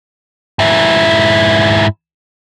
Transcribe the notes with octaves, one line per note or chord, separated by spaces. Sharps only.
G#2 E4